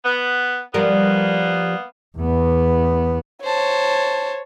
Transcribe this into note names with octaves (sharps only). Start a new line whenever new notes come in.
B3
F3 G3 A#3 B3 A#4
E2 B3
C5 C#5 A5